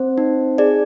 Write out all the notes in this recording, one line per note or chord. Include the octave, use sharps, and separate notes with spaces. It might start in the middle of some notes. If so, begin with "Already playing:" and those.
Already playing: C4 C5
D#4
G#4 D5